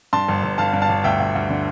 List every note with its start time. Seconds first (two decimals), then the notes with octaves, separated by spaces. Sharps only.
0.13 G2 A5 C6
0.28 G1
0.43 G1
0.58 G1 F5 A5
0.73 G2
0.82 F5 A5
0.89 G1
1.04 D2 E5 G5
1.20 D2
1.35 D2
1.50 D3